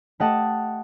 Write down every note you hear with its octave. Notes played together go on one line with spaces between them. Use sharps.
A3 G4 D#5 F#5 A5